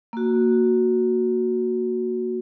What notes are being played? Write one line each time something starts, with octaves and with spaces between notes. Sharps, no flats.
A#3 F#4